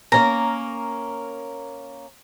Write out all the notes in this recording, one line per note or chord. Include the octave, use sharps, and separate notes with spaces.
A#3 C#4 A#4 A#5